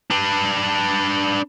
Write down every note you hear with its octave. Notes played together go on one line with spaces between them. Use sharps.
D4 B4